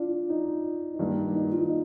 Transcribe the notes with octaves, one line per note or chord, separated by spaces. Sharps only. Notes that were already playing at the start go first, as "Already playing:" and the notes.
Already playing: D4 F4
D#4
D#4
G2 D#3 A#3 D4
D#4
D#4
F4
D#4